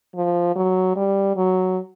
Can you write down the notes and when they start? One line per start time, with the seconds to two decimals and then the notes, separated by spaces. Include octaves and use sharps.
0.15 F3
0.56 F#3
0.96 G3
1.36 F#3